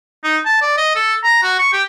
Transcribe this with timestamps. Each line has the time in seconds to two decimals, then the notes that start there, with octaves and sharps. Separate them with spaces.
0.24 D#4
0.46 A5
0.62 D5
0.77 D#5
0.95 A4
1.24 A#5
1.43 F#4
1.59 C#6
1.73 G4